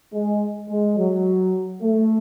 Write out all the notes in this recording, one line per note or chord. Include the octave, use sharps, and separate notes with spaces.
G#3
G#3
F#3
A3